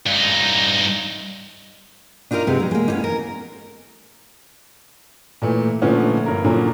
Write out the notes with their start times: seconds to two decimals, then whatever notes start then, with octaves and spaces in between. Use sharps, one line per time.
0.07 G2 D#4
2.31 D4 D#4 F4 A4 A#4
2.47 C3 G#3 B3
2.60 F#3
2.71 G#3 A#3
2.88 B3 C#4 D#4
3.04 A#4
5.42 A#2 E3 A3
5.82 A#2 D3 F3 A3 B3 C#4
6.26 G2 A#4
6.44 A#2 D3 F3 F#3 C#4 A#4